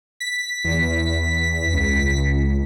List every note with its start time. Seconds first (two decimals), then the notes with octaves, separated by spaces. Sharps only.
0.20 B6
0.65 E2
1.73 C#2